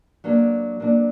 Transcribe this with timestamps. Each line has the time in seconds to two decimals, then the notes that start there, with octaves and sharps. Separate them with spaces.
0.24 F#3 A#3 D4
0.80 F#3 A#3 D4